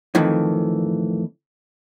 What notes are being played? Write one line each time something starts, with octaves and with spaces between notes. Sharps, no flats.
F2 A2 D#3 E3